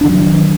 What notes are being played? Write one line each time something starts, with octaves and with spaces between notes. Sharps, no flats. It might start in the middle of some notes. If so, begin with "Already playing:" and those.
D#3 F#3 D4